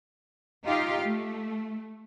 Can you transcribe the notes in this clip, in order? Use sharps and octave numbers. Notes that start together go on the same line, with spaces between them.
D#4 F4 G4 F5
A3